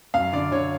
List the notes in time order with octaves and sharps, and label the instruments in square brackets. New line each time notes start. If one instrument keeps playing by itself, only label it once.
[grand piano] F#2 F5
D3 D5
D3 C#5